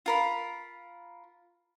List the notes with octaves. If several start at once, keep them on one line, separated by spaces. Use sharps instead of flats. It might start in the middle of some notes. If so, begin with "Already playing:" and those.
F4 A#4 B5